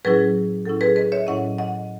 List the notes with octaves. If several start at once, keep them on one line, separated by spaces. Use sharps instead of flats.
A2 F#3 C#4 E4 G#4 B4
A2 F#3 C#4 E4 A4
G#4 B4
B4 D#5
C#5 E5
A2 F#3 C#4 E4 D#5 F#5
D#5 F#5